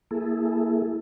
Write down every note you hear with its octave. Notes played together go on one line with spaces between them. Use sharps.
A#3 E4 G#4 A4